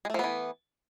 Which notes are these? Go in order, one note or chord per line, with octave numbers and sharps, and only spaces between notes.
E3 F3 G#3 A3 B3